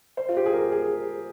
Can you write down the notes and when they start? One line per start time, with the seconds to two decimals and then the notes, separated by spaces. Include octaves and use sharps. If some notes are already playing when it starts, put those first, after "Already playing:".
0.17 C5
0.29 F4
0.37 G4
0.46 G#4
0.53 A#4
0.72 G#4